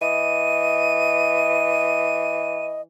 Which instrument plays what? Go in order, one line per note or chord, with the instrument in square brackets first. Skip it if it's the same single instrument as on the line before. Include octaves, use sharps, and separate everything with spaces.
[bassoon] E3 [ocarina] D#5 [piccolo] D#7